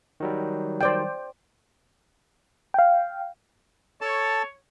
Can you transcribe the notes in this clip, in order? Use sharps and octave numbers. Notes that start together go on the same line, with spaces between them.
D#3 F#3 G3
C5 D5 G5
F5 G5
A4 C#5 A5